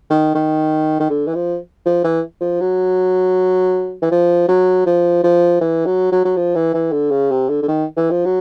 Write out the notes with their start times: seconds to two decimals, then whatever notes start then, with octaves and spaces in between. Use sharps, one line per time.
0.10 D#3
0.35 D#3
1.00 D#3
1.10 D3
1.27 E3
1.35 F3
1.86 F3
2.04 E3
2.41 F3
2.61 F#3
4.02 E3
4.11 F3
4.48 F#3
4.86 F3
5.24 F3
5.61 E3
5.86 F#3
6.12 F#3
6.25 F#3
6.37 F3
6.55 E3
6.74 E3
6.92 D3
7.11 C#3
7.31 C3
7.49 D3
7.62 D3
7.68 D#3
7.97 E3
8.11 F3
8.25 F#3